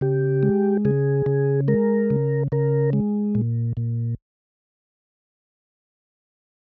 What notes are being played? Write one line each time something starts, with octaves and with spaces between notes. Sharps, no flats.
C#3 G4
G#3
C#3 G#4
C#3
G#3 A#4
C#3
C#3 A#4
G#3
A#2
A#2